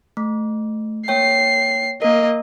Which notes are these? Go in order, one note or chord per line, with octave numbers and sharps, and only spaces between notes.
A3
A#3 C#5 G5 C7
A#3 A#4 D#5